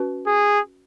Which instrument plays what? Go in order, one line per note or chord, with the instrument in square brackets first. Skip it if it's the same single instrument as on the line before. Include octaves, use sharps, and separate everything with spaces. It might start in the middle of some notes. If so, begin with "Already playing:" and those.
Already playing: [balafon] C#4 F#4 B4
[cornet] G#4